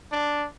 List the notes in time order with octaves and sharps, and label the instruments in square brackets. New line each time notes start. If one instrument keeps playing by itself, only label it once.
[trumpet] D4